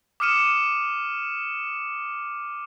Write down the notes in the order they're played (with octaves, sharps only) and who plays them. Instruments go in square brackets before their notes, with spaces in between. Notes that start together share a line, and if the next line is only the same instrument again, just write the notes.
[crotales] D6 D#6 F6 C#7 D#7 E7